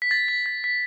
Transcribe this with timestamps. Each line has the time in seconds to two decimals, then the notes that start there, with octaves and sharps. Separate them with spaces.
0.02 B6
0.11 A6
0.28 B6
0.46 A6
0.64 B6